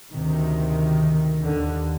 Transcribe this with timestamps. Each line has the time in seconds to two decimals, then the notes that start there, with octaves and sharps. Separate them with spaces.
0.13 D2 C3 D#3
1.41 D#2 D3